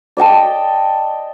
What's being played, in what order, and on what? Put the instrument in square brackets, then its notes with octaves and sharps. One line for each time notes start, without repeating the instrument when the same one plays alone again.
[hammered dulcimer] D5 D#5 G5 A5